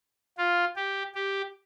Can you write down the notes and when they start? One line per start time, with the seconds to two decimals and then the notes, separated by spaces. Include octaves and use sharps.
0.38 F4
0.76 G4
1.15 G4